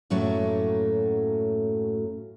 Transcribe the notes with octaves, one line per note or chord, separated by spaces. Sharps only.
F#2 A2 F#3 A3 A#3 C#4